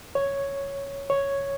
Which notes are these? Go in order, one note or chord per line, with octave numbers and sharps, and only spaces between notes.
C#5
C#5